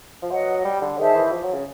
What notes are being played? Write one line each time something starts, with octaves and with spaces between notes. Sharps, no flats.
F3
F#3 B4 D#5 F#5
G3
D3
D#3 G#4 C5 E5 A5
E3
F3
F#3
C#3